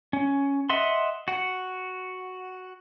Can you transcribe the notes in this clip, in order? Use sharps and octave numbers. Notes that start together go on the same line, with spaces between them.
C#4
D#5 E5 F#5 C6
F#4 F#5